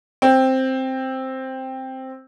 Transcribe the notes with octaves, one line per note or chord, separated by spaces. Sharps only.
C4